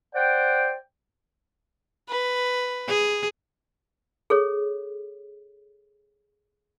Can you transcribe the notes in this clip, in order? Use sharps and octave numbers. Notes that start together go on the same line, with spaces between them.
C5 D5 F#5 G5
B4
G#4
G#4 A4 C#5